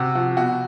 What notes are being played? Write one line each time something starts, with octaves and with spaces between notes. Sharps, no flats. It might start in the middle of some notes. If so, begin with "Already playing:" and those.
Already playing: C3 F#4
F3 F#4
B2 F#4